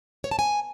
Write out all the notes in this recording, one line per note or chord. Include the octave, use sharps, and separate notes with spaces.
C#5
A5
G#5